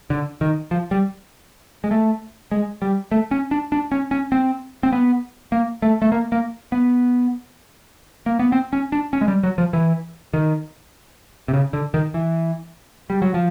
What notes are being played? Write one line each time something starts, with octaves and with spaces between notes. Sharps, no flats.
D3
D#3
F3
G3
G#3
A3
G#3
G3
A3
C#4
D4
D4
C#4
C#4
C4
C4
B3
A#3
A3
A3
A#3
A#3
B3
A#3
B3
C4
C#4
D4
C#4
G#3
G3
F#3
F3
E3
D#3
C3
C#3
D3
D#3
E3
G3
F#3
F3